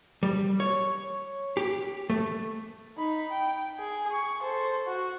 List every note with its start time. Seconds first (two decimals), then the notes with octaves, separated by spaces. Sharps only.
0.23 G3
0.60 C#5
1.57 G4
2.10 A3
2.97 D#4 B5
3.31 G5
3.79 G#4
4.11 C#6
4.42 A4 C5
4.87 F#4